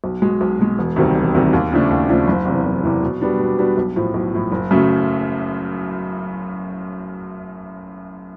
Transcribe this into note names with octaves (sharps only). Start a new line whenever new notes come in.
B1
B2 G#3
B1
B2 G#3
E1
D2 C3 D#3 G3
E1
D2 C3 D#3 G3
D#2
C#3 F3 A3 D4
D#2
C#3 F3 A3 D4
F#1
E2 C3 E3
F#1
E2 C3 E3
B2
G3 B3 D4 F#4
B2
G3 B3 D4 F#4
B1
A2 F3
B1
A2 F3
F#1
F#2 C#3 F#3 A3